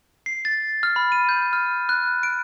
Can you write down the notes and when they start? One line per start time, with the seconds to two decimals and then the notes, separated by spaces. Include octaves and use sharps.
0.26 C7
0.45 A6
0.83 F6
0.96 B5
1.12 D#7
1.29 G6
1.53 F6
1.89 F#6
2.23 D7